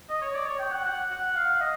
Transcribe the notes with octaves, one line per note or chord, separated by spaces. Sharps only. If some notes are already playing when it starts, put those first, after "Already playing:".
D#5
C#5
D5
C#5
G5
F#5
F#5
F#5
F5
D#5